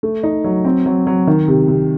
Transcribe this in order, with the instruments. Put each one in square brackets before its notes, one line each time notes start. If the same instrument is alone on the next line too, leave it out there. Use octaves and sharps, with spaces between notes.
[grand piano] A3
D#4
F#3
C4
F#3
F#3
D#3
C3
C3